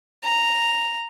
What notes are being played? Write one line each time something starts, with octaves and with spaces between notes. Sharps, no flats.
A#5